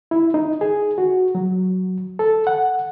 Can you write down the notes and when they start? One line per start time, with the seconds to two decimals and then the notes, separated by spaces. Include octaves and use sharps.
0.11 E4
0.34 D#4
0.61 G#4
0.98 F#4
1.35 F#3
2.19 A4
2.47 F#5